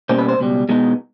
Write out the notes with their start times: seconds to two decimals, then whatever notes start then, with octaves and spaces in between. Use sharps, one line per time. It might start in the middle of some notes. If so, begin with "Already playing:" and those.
0.09 B2 G3 A#3 C#4 C5
0.19 B4
0.29 C5
0.39 C#2 B2 G3
0.69 B2 G#3 B3 D#4